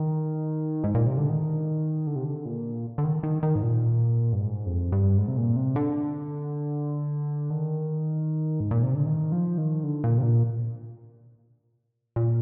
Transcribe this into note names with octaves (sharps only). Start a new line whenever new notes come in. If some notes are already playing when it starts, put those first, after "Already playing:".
Already playing: D#3
G#2
A#2
C3
D3
D#3
D3
C3
D3
A#2
D3
D#3
D#3
D#3
G#2
A#2
G2
G#2
F2
G2
G#2
C3
A#2
C3
D3
D#3
G#2
A#2
C3
D3
D#3
F3
D#3
D3
A#2
C3
A#2
A#2